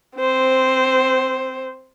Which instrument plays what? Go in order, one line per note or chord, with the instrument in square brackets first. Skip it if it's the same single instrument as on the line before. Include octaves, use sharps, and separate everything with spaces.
[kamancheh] C4 C5